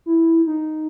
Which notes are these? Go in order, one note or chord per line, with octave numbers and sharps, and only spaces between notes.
E4
D#4